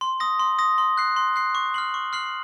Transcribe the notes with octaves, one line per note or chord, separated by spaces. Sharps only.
C6
D#6 A#6
C6
D#6 A#6
C6
F#6 C7
C6
F#6 C7
C#6
F6 C7 F#7
C#6
F6 C7 F#7